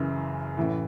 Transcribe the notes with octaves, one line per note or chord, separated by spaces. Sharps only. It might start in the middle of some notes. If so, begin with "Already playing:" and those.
Already playing: F#1 F#2 C#3 E3
A1 A2 E3